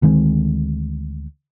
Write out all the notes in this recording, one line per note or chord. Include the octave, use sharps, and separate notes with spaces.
D2 D#3 G#3 C4